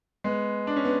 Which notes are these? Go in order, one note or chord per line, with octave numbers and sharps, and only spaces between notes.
G#3 B3
D4
C#4
B3